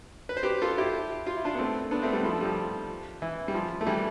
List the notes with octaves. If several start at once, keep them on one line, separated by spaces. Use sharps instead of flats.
B4
C5
G4 B4
F4 A4
E4 G4
F4
E4
D4 F4
B3
A3 C4
B3 D4
A3 C4
G3 B3
F3 A3
G3
F3
E3
G3
F3
A3
E3 G3